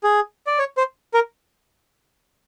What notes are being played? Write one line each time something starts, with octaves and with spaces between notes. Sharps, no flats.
G#4
D5
C#5
C5
A#4